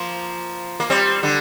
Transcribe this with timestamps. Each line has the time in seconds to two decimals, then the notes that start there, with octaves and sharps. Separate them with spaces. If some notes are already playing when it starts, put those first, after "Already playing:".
Already playing: F3 A#3
0.80 A#3
0.90 G3 C4
1.23 D3 G3